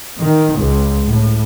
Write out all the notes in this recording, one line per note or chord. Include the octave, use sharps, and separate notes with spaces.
D#3
C#2
A2